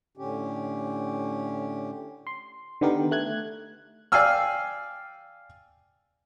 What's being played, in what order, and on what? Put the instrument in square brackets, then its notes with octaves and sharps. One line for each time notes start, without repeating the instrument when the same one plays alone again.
[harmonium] A2 D3 C#4 G4
[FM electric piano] C6
D3 D#3 B3 G4 A#4
A3 F#6 G#6
[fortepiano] D5 F5 G5 G#5 E6 F6